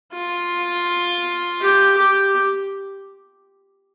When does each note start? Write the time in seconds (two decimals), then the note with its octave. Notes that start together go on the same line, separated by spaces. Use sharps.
0.13 F4
1.61 G4
1.98 G4